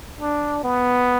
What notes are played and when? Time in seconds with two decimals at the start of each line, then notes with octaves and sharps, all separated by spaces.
0.19 D4
0.64 B3